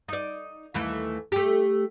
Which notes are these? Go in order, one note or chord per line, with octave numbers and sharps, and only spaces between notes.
D#4 D5
D#2 E3 A3
A3 G4